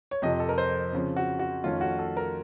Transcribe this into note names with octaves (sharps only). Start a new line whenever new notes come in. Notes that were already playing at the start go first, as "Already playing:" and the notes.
C#5
F2 C3 F3 D#5
A4
A#4
C5
C#3 F3 C4
F#4
F#4
F2 D#3 A3 C#4 F4
F#4
A4
A#4